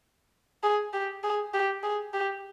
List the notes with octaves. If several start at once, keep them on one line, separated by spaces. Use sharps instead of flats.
G#4
G4
G#4
G4
G#4
G4